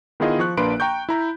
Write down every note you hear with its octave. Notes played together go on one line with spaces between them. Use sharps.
D#3 B3 E4 F4 G#4 D#5
F3 C#6 F#6
A#1 A#3 D4 B4 C6 D7
G5 A#5 C#6 G6
E4 A#5 B5